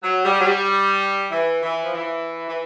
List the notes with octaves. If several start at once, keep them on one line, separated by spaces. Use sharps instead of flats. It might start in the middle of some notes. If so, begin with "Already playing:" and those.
F#3
G3
F#3
G3
E3
E3
F3
E3
E3